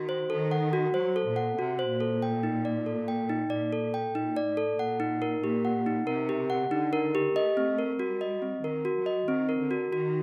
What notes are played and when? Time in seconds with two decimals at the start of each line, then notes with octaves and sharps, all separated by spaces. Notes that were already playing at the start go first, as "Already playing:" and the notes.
Already playing: D#3 F#4
0.09 C5
0.30 D#3 A4
0.51 F#5
0.73 F#4
0.94 F#3 C5
1.16 A4
1.27 A#2
1.36 F#5
1.58 C3 F#4
1.79 C5
1.90 A#2
2.00 A4
2.22 G5
2.43 D#4
2.65 D5
2.86 A4
3.08 G5
3.29 D#4
3.50 A#2 D5
3.73 A4
3.94 G5
4.15 A#2 D#4
4.36 D5
4.46 A2
4.57 A4
4.79 A#2 F#5
5.00 D#4
5.22 A#4
5.43 A#2 G4
5.65 F#5
5.86 D#4
6.07 C3 A#4
6.29 G4
6.50 F#5
6.71 D3 D#4
6.93 A#4
7.15 G4
7.35 A3 D#5
7.57 C4
7.79 A#4
7.99 G3 F#4
8.21 D#5
8.42 C4
8.64 D#3 A#4
8.85 F#4
8.96 F#3
9.06 D#5
9.28 D#3 C4
9.49 A#4
9.60 D3
9.71 F#4
9.92 D#3 F#4